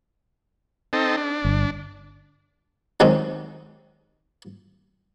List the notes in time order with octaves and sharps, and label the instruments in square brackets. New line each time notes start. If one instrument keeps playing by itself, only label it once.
[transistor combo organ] C4 D#4 A4
D4
[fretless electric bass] G1
[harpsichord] D#3 F#3 G#3 C4 C#4